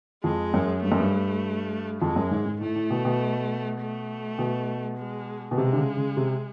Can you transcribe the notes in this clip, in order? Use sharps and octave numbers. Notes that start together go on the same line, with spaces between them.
F2 G#3
F#2
G2 A3
F#2
G2
F2 G#3
F#2
G#2
G#2
A2 A3
A2
B2
B2
A3
B2
G#3
B2
C3 G#3
D3
C#3
C#3
C3